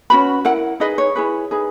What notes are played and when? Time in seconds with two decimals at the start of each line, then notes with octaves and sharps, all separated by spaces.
0.10 C#4 F#4 B4 B5
0.45 E4 A#4 F#5
0.80 D#4 G#4 B4 D#5
0.98 C#5
1.16 E4 G#4 B4
1.51 D#4 G#4 B4